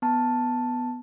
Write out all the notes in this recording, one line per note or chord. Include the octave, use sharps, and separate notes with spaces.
B3 A5